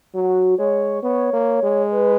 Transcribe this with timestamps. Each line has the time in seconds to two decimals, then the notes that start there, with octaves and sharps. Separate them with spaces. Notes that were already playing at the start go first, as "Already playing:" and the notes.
0.14 F#3 F#4
0.58 G#3 C#5
1.03 B3 C#5
1.33 A#3
1.63 G#3
1.91 B4